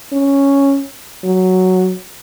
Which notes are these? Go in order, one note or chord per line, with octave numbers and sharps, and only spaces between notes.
C#4
F#3